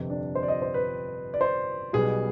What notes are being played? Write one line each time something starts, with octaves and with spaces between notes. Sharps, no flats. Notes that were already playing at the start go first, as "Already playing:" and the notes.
Already playing: G1 F2 C3
D4
C5
D5
D#5
C5
B4
D5
C5
B1 B2 G3 B3 G#4